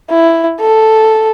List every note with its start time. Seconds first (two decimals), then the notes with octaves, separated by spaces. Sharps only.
0.10 E4
0.61 A4